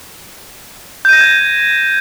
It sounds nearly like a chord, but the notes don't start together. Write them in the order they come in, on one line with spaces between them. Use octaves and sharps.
G6 D#7 A#6 E7 G#6